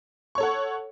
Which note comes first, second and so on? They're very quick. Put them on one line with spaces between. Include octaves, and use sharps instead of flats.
C#6 C#5 A4 F#5